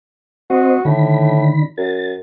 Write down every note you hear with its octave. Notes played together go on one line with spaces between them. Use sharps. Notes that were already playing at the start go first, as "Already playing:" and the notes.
C4 F#4 C5 D#5
A2 D3 D#3 B5
F#2 A6